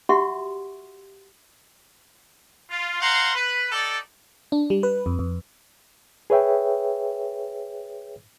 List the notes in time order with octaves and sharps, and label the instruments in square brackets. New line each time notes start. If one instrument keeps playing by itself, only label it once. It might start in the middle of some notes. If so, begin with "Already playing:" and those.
[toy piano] F#4 G4 E5 F#5 C6 C#6
[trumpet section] F4
C5 F5 F#5 A#5 C6
B4
D#4 G4 A4 D5
[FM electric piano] D4
G3
B4
F2
F2
[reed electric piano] G#4 B4 C#5 E5 G5